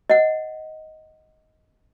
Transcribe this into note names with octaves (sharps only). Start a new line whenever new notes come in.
D#5 F#5